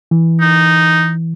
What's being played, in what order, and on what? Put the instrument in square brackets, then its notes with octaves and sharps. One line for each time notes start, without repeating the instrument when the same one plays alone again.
[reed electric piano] E3
[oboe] D#4